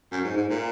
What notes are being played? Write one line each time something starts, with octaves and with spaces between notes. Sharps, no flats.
F#2
G#2
G#2
A#2